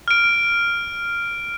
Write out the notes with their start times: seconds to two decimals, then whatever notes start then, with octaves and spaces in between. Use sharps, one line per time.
0.08 F6 D7